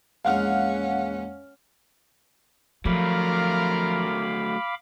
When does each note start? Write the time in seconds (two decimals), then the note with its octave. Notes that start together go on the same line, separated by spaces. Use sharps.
0.25 A#1 E2 G#3 C#4 F5 F#5 F6
2.85 F3 F#3 A3 F4 A#4 F5 B5 D6